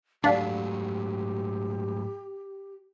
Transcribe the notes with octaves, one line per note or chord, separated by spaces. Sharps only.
G#2 F#3 A3 D4 G4 D5 F5 F#5